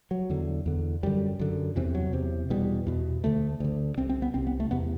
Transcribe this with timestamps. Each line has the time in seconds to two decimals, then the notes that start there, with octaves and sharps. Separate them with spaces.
0.11 F#3
0.30 E2 D3
0.66 E2 D3
1.03 F#2 D3 G3
1.39 F#2 D3
1.76 E2 C3 E3
1.95 F#3
2.13 E2 C3
2.50 E2 B2 G3
2.87 E2 B2
3.24 D2 D3 A3
3.60 D2 D3
3.97 C2 C3 C4
4.09 C4
4.22 B3
4.34 C2 C3 C4
4.47 B3
4.60 A3
4.71 E2 C3 B3